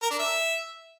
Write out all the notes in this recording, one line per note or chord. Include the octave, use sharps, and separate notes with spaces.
A#4
D4
E5